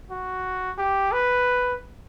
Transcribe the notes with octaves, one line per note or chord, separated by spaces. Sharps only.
F#4
G4
B4